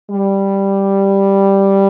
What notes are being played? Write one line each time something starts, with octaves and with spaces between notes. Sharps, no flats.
G3